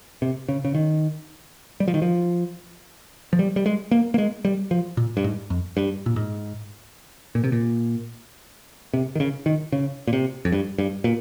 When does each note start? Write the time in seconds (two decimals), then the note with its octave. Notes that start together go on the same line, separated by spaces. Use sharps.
0.22 C3
0.49 C#3
0.65 C#3
0.75 D#3
1.80 G3
1.88 F3
1.94 D#3
2.02 F3
3.33 F3
3.39 G3
3.56 G3
3.66 G#3
3.91 A#3
4.14 A#3
4.18 G#3
4.45 G3
4.71 F3
4.97 A#2
5.17 G2
5.24 G#2
5.50 F2
5.77 G2
6.06 A#2
6.16 G#2
7.35 A#2
7.44 C3
7.52 A#2
8.94 C3
9.15 D#3
9.20 C#3
9.46 D#3
9.72 C#3
10.07 A#2
10.13 C3
10.45 F2
10.52 G2
10.78 G2
11.04 A#2